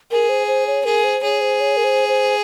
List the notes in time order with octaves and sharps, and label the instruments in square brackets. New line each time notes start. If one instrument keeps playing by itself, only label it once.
[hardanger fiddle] G#4 [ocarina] A#4
[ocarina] C5
C5
C#5
[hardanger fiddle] G#4 [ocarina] A#4
[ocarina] C5
[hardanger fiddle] G#4 [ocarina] C#5
[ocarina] C5
C#5
A#4
C5
C5